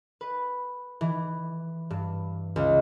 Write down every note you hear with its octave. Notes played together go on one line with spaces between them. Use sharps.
B4
E3
G2
C#2